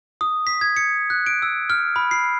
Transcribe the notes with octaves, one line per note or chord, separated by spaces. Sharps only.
D#6
B6
G#6
C#7
F#6
D7
E6
F6
B5
C7